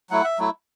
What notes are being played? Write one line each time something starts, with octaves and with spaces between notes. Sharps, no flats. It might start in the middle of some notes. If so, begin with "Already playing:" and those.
F#3 A3 E4 F#5
E5
F#3 A3 E4